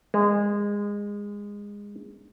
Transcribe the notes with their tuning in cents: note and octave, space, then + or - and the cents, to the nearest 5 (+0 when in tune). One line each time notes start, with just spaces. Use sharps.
G#3 -20